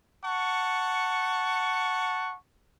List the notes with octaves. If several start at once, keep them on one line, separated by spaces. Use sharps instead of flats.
F#5 A5 C#6